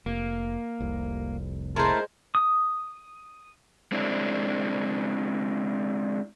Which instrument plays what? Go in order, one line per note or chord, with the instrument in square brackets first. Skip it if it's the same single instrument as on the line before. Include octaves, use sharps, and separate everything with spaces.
[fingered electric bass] F1 [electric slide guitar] A#3
[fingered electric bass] F1 C2
[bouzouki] G#3 C5 [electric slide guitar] A3 E4 [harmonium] A#4 A5
[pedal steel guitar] D#6
[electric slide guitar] G#3 C4 D4 E4